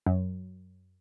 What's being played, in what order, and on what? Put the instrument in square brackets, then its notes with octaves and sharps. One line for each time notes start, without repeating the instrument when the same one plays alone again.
[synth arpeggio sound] F#2